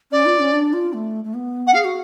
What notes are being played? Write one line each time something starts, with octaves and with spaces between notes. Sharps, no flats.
C#4 D5
F4
C#4
D4
F4
A3
A3
B3
F#5
G#4 F5
F#4